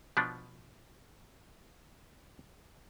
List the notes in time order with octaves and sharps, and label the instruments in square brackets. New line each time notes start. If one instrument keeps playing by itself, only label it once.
[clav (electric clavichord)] B2 F3 B3 D4